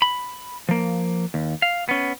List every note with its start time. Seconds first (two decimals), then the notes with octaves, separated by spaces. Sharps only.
0.02 B5
0.69 F3 A#3
1.34 D#2
1.62 F5
1.89 B3 C#4